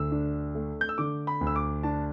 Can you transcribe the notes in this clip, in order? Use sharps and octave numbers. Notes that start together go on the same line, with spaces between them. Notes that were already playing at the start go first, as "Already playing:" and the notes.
Already playing: D2 D3 E6
D4
A3
G6
E6
D3 D6
B5
D2
E6
D6
D4 A5